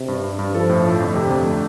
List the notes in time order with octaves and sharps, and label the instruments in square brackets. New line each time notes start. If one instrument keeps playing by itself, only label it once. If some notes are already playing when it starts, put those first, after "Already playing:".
Already playing: [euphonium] C3
[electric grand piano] G2
G2
G2
[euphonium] F3 [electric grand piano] A4
[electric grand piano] A2
A3
[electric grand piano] F2 [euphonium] D3
[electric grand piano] C3
F2
A3